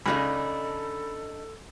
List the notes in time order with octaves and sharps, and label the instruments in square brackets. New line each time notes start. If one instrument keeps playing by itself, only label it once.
[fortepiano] C#2 C#3 [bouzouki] D4 D#4 D#5 [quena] A4 [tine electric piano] B5